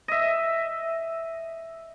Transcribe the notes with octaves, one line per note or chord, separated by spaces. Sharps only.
D#5 E5